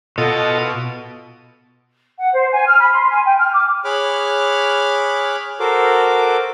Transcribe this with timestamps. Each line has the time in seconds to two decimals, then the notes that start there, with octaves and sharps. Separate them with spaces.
0.18 B2 F4 A4 D#5
2.19 F#5
2.33 C5
2.51 G#5
2.67 F6
2.79 B5
2.92 C6
3.09 G#5
3.23 G5
3.39 F6
3.51 D6
3.85 G#4 C#5 B5 D6 F6 F#6
5.60 F#4 A4 A#4 C5 D6